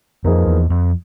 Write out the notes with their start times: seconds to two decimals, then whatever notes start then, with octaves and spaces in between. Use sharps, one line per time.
0.24 F2 F3 A#3 D#4 G#4 B4
0.47 E2
0.70 F2